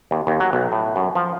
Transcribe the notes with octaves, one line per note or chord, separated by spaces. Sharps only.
D#2
D#2
F#3
B1
A2
F#2
F3